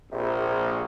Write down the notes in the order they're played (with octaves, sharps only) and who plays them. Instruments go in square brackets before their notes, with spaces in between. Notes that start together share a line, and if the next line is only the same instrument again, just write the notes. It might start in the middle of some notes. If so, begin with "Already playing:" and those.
[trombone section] A#1 [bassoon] C3 [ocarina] G#4